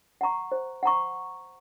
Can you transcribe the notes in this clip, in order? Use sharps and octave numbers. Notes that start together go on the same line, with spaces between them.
F#5 A#5 C#6
C5
F#5 A#5 C#6